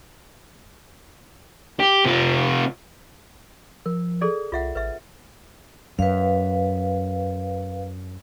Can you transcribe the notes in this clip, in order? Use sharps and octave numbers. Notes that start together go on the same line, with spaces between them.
G4
C3 F4
F3 A#4
G#4 A4 D5
C2 F4 E5 F#5
A1 B4 E5
F#2 B4 F5